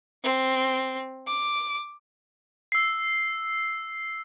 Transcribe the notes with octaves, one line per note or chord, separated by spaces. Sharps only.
C4
D6
E6 C7